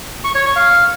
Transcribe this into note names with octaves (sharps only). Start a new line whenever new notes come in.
C#6
C#5
C#6
F5